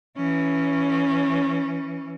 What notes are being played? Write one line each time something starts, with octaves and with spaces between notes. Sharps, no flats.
E3 C#4